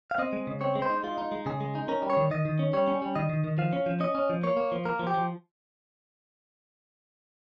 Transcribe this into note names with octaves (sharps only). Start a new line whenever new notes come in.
F5
C4 D#5
G#3
C#3
C4 C#5
G#3
C5
D#4
G#3 F4
D#4
G#3
C#3 G#4
G#3
D#4
C#4 A#4
G3
C#5
D#3
D#3 D#5
D#3
C#4
G3 C#5
C#4
G3
D#3 D#5
D#3
D#3
F3 F5
C#4
F3
C#4 D#5
C#4
F3
A#3 C#5
A#3
F3
A#3 A#4
F3
G4
F3